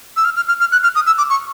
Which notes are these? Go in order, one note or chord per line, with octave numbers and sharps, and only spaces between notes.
E6
F6
F6
F6
F6
F#6
F6
D#6
E6
D6
C#6